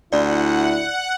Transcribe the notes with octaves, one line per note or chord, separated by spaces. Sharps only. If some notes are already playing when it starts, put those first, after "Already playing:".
D2 E4 D5 F#5